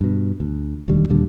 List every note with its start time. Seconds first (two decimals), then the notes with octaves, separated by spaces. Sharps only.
0.01 G2 B2
0.40 D2
0.88 E1 D2 D#3 G3
1.09 D#2 A#2 D3 G3